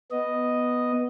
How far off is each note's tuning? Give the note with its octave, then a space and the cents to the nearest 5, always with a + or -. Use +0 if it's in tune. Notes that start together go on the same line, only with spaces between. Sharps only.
B3 +0 D#5 +0